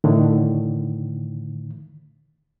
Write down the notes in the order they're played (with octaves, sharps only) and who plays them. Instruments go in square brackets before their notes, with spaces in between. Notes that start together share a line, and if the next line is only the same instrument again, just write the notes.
[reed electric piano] A2 D3 D#3